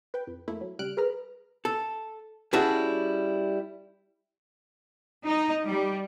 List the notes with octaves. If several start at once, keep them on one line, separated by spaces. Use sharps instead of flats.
B4 G5
F2
F2 A3 A#3 E4
F#3
C#2 G3 F6 F#6 D7
G#4 A#4 B4 A#5 F6
A4
G3 C#4 E4 F#4 G#4 A5
D#4
G3